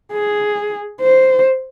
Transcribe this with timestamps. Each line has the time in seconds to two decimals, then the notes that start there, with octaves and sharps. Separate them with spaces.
0.12 G#4
1.01 C5